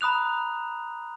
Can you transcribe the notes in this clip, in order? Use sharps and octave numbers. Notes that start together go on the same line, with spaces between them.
A#5 B5 D#6 F#6 F7